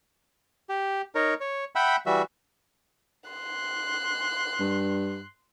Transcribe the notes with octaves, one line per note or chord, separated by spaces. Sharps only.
G4
D#4 A#4 C#5
C#5
E5 F#5 G5 B5
E3 G3 F#4 E5
C6 F#6
G2